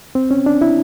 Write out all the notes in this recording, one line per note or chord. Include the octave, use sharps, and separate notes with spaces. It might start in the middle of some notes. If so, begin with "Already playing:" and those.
C4
C#4
D4
E4